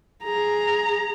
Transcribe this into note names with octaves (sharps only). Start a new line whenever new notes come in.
G#4 A#5